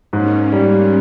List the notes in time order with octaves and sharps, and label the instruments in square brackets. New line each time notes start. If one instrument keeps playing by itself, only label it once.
[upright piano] G#2 [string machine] A#3 C#4
[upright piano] G3